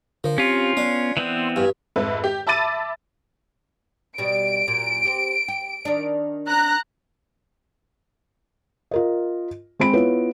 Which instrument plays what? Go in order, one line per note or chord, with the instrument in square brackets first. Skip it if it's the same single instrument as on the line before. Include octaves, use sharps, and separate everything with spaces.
[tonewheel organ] D3 A#4 [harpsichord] F3
[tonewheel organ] C4 G4 [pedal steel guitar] C#4 F4
[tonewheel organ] B3 [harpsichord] D4
[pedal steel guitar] E3 B3 C4 [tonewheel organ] C6
[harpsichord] G2 [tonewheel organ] F5 G#5
[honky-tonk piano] F2 G#2 B4 E5
G4
E5 A5 B5 D6 A6 D#7
[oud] B2 G3 [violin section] D7
[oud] A#2 F#3
C4 G4
G4
D#3 D4
[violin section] A#5 F#6
[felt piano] F4 A#4 D#5
G#3 C4 B5 D7
B3 E4 F4 B4 C#5